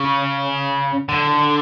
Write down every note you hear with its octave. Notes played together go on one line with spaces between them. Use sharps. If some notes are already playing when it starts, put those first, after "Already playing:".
Already playing: C#3
D3